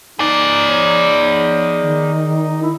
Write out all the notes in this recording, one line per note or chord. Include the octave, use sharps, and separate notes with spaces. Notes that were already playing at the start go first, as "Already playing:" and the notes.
D#4 G#4 D5
C#5
D#3
E4